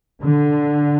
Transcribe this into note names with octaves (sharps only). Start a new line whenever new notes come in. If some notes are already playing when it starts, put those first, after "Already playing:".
D3